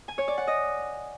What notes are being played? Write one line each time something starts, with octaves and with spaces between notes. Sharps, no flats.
G#5
C#5
D5
F#5
D#5